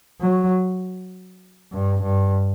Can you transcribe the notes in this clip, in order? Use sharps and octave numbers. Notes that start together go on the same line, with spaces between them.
F#3
G2
G2